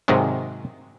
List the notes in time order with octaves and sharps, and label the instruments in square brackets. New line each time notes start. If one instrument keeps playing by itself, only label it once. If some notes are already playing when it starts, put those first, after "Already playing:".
[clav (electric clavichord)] G#2 C3 D#3 F#3 G#3